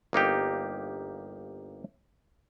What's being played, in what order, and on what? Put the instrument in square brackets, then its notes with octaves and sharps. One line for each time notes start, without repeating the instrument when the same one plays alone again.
[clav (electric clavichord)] G1 A#3 D#4 G4